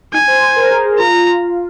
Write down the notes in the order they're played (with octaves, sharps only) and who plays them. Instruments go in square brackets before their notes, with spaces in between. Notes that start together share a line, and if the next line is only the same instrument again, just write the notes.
[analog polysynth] D#4 [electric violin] G#5
[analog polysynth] C5
C5
A#4
G#4
G#4
[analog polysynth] F4 [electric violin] A#5